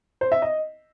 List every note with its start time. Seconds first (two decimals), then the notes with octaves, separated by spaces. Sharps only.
0.21 C5
0.32 E5
0.42 D#5